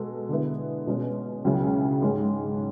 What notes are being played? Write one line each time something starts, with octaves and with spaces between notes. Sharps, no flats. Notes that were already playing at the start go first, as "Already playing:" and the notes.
Already playing: B2 G#3 F#4 A4
D3 G#3 B3 E4
B2 G#3 C#4
C#2 C#3 F#3 C#4 E4
G#2 G#3 C#4 G#4